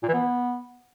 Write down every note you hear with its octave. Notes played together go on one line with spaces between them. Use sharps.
A#2
E3
B3